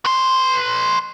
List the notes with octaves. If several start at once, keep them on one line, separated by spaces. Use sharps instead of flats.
B4 C6